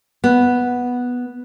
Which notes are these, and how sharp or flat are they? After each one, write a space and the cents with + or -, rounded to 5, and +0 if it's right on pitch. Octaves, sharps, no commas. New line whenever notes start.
B3 -5